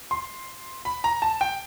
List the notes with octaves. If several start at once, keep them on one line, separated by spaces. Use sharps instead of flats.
C6
B5
A#5
A5
G5